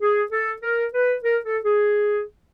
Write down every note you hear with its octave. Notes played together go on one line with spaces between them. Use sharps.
G#4
A4
A#4
B4
A#4
A4
G#4